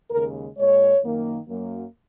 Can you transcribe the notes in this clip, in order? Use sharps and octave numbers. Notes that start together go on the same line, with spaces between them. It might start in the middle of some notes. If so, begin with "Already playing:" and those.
D#2 C#3 G#3 A#4
A#2 G#3 C#5
F#2 D#3 A#3
F#2 F#3 A#3